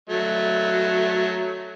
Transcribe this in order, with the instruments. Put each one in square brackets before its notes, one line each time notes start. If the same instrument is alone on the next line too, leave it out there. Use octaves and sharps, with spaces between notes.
[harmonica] F#3 A3